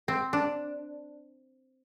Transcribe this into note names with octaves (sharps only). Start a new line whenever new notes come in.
C4
D4